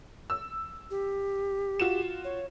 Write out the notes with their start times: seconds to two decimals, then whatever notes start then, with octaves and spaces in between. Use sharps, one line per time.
0.30 E6
0.91 G4
1.80 F4 F#4 E7
2.24 C#5